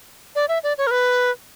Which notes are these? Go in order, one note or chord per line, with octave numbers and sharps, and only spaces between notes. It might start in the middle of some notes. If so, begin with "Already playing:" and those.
D5
E5
D5
C#5
A#4
B4